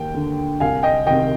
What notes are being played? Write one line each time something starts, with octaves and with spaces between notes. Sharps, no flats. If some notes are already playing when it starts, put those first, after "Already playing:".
Already playing: D#2 G5
D3
C2 F5 G#5
D#5 G5
C3 D#3 D#5 G5